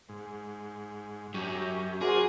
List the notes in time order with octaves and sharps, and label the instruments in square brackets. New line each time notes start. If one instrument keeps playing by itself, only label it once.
[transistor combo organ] G#2
[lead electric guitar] F#2 [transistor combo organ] C#4 G4
[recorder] F#4 [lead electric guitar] G#4 [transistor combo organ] A#4 C5 D5